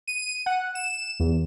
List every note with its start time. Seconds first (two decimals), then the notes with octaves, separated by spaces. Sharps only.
0.07 D#7
0.46 F#5
0.75 E7
1.20 E2